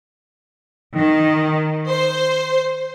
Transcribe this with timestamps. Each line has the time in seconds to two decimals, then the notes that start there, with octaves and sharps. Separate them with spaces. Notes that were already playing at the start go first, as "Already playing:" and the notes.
0.96 D#3
1.88 C5